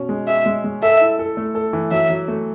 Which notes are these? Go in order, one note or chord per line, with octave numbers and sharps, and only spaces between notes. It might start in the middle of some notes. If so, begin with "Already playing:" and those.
Already playing: B2 C#4
G#3
G#4 E5
G#3
G#3
A4 E5
E4
A4
A3
A4
E3
F#3 E5
F#3
A3